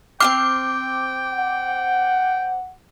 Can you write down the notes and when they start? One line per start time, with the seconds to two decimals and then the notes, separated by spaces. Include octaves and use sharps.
0.20 C4 F4 G5 D6 F6
1.34 F#5